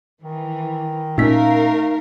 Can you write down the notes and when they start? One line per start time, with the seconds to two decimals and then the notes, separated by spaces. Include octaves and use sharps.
0.22 D#3 E3
1.18 A#2 A3 C4 C#4 D#4 A#4 F5 B6